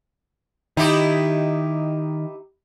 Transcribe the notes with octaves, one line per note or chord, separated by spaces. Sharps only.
D#3 D#4 E4 G4